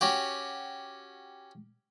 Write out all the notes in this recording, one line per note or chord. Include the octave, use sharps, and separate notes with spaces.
C#4 F#4 G4